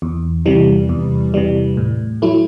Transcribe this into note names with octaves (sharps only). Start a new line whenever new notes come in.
E2
C3 E3 G3
E2
C3 E3 G3
A2
F#3 A3 E4